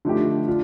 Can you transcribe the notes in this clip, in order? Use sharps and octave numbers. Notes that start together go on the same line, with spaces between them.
D3 F3 A3 D#4 G4
D4 F4